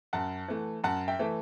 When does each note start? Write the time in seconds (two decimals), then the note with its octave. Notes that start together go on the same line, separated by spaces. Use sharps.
0.13 F#2 F#5 A5
0.48 E3 A3
0.84 F#2 F#5 A5
1.08 E5 G5
1.19 E3 A3